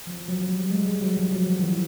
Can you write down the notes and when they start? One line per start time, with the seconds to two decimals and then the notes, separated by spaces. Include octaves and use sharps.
0.07 F3
0.28 F#3
0.39 F#3
0.49 G3
0.70 G#3
0.85 G3
1.02 F#3
1.17 F3
1.32 F#3
1.46 F3
1.59 E3